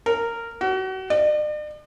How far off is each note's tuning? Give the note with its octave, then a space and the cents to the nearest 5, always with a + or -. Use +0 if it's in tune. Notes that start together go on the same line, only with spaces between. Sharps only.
A#4 -15
F#4 +35
D5 +45